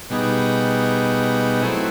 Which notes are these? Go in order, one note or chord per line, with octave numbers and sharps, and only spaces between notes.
B2 G3 B3 D#4 G#4
F#3 A3 C4 E4